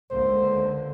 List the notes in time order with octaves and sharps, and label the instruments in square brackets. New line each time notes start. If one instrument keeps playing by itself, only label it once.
[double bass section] C#2 D3 A#3 [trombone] C5